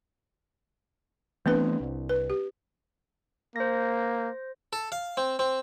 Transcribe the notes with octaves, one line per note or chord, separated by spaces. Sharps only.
E3 A3 B3 C4 D4 B4
C2
B4
G4
A#3 C5 A#6
A4
F5
C4
C4